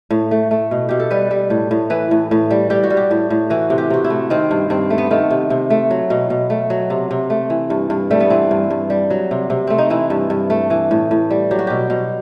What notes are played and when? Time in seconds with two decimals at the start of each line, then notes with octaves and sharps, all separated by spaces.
0.10 A2
0.31 A3
0.51 A3
0.71 B2
0.89 B2 G4
1.00 A4
1.11 G3 B4
1.31 G3
1.50 A2
1.71 A2
1.90 E3 B4
2.11 A2
2.31 A2
2.51 G3
2.70 G3 G4
2.83 F#4
2.90 G3
2.97 G4
3.11 A2
3.30 A2
3.50 E3 F#4
3.70 C3
3.78 G4
3.90 C3 F#4
4.04 E4
4.10 A3
4.30 D#3 C4
4.51 G2
4.70 G2 C4
4.90 A3
4.98 B3
5.11 D#3 A3
5.31 C3
5.50 C3
5.70 A3
5.91 F#3
6.10 B2
6.30 B2
6.50 A3
6.70 F#3
6.90 C3
7.11 C3
7.30 A3
7.50 E3
7.70 G2
7.90 G2
8.11 G3 A3
8.20 B3
8.30 E3 C4
8.51 G2
8.70 G2
8.90 G3
9.10 F#3
9.31 C3
9.50 C3
9.67 A3 C4
9.78 D#4
9.90 E3 E4
10.10 G2
10.30 G2
10.50 A3
10.70 E3
10.91 A2
11.11 A2
11.30 G3
11.51 F#3 G4
11.59 F#4
11.67 B2 G4
11.90 B2